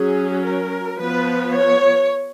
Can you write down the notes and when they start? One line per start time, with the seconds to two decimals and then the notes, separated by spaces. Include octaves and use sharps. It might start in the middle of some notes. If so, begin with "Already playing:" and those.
Already playing: F#3 C#4 G#4
0.45 A#4
0.99 F3 B3 B4
1.54 C#5